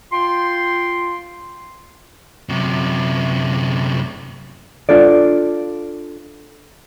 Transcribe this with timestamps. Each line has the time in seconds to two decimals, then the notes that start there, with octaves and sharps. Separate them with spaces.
0.12 F4 G5 C6
2.49 F#2 C3
4.89 D4 F4 A4 D5